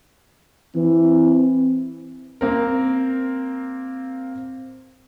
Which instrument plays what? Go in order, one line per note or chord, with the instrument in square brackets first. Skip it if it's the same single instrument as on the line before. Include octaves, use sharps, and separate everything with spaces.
[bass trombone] E3 [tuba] C4
[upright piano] A#3 C4 A#4